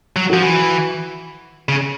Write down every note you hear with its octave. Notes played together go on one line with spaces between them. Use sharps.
F#3
F3 F#4
E3
C#3